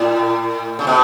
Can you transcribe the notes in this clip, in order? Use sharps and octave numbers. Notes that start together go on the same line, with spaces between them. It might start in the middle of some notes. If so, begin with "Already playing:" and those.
Already playing: A2
C#3
B2